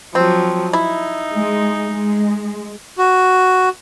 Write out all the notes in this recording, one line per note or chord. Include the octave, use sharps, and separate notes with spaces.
F3 F#3 C4
D#4 E4
G#3
G#3
F#4